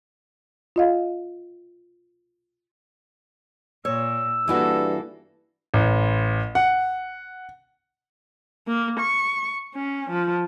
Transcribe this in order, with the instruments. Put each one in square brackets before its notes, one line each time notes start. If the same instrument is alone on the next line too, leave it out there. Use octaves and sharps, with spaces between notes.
[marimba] F4 D#5 F5
[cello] A#2 [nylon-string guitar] C#5 [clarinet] E6
[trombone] G2 [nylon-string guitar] E3 E4 F#4 [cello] A#3 A4
[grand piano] A1
F#5
[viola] A#3
C#6
C#4
F3